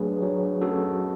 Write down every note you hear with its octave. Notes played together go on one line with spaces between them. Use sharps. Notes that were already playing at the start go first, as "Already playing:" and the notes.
Already playing: F#3 A3 D4 G#4 B4
F#3
C#4 F#4 A4